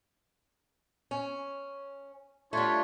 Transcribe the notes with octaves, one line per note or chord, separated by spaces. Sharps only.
C#4
G3 A3 D4 F4 C#5